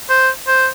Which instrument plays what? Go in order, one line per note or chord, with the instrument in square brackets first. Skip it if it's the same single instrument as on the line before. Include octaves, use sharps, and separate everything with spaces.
[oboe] C5
C5